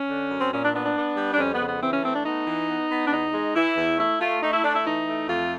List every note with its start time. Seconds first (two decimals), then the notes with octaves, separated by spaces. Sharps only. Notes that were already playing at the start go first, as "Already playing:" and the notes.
Already playing: C#4
0.09 D3
0.30 F#2
0.41 C4
0.52 A#2 C#4
0.62 D4
0.74 B3 D4
0.84 D4
0.96 B3
1.17 G3
1.32 D4
1.38 F2 C#4
1.53 B3
1.61 C#3
1.68 B3
1.82 E3 C4
1.93 C#4
2.03 A3 C4
2.14 D4
2.25 B3 D#4
2.47 E3
2.69 B3
2.91 B3
3.07 D4
3.12 E2 D#4
3.33 G#3
3.56 E3 E4
3.78 E2
3.98 A3 E4
4.20 A3 F4
4.43 A3 D#4
4.53 E4
4.64 A3 D4
4.75 E4
4.86 E3 D#4
5.07 A3
5.29 F2 F4